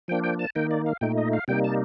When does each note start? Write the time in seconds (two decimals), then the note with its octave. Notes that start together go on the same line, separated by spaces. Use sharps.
0.08 F3 A#3 D4 G5
0.24 G5
0.39 A5
0.55 D#3 A#3 D#4 G5
0.71 D5
0.86 F5
1.01 A#2 A3 D#4 G5
1.17 D#5
1.33 F5
1.48 C3 G3 A#3 D#4 G5
1.64 A5